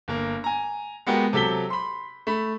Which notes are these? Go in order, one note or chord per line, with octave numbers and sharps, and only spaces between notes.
G1 A#3
G#5 A#5
G#3 B3 F#4 G4 A#4
C3 F#3 A4 B6 G7
B5 C6
A3 B5